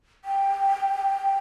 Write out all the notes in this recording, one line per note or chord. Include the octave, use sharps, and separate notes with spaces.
G5